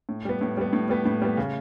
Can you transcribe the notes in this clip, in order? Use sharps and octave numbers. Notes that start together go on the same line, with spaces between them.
A2
G3 B3
A2
G3 B3
A2
G3 B3
A2
G3 B3
C#3